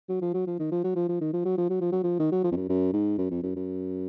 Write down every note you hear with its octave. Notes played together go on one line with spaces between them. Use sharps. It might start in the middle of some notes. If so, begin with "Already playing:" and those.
F#3
F3
F#3
F3
D#3
F3
F#3
F3
F3
D#3
F3
F#3
F3
F#3
F3
F#3
F3
D#3
F#3
F3
F2
F#2
F#2
G#2
F#2
F2
F#2
F#2